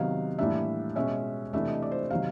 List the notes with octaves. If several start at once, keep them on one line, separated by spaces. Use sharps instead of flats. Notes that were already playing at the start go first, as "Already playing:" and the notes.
Already playing: C3 D#3 F#3 B3 F5
A2 E3 G3 A#3 D4 E5
B2 G#3 C#4 E5
C3 E3 A3 D4 E5
D#5
D5
C5
C3 D#3 F#3 F5